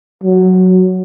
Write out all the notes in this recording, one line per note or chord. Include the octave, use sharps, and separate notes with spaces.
F#3